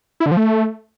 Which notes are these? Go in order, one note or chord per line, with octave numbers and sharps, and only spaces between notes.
E4
D3
F3
A3